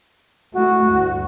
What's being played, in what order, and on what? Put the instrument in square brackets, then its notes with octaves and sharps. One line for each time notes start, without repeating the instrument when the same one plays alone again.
[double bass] A3 E4 [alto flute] F#4
[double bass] D2 G2